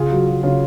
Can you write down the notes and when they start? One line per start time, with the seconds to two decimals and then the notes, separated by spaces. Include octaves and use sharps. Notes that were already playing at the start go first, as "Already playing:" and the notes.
Already playing: C#3 F4 G#4
0.11 F#3
0.27 F#3
0.43 C#3 C#4 F4